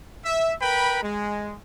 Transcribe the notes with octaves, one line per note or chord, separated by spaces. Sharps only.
E5
A#4 B4 G5 B5
G#3